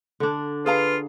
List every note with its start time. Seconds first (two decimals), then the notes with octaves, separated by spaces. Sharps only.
0.20 D3 D4
0.66 F4 G#4 B4 F5 A#5